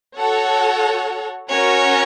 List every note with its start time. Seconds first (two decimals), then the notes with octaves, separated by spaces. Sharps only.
0.17 F#4 A4 C#5 F#5
1.48 C#4 F#4 A#4 C#5